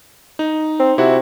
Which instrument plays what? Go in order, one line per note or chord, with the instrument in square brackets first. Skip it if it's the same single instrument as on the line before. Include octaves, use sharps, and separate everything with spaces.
[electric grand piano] D#4
[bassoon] C4
[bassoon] C3 [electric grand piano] E4 F#4 F#5